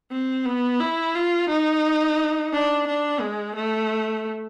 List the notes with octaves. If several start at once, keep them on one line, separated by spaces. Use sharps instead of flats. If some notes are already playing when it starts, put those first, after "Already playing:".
C4
B3
E4
F4
D#4
D4
D4
G#3
A3